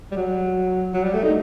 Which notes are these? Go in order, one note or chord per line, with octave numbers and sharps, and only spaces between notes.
G3
F#3
F#3
G3
A3
D#4